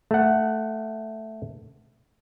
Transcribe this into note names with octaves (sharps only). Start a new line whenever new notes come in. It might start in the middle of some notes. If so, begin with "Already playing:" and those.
A3 F#5